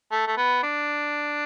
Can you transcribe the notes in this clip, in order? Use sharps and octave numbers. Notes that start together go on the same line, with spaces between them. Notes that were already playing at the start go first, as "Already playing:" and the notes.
A3
A3
B3
D4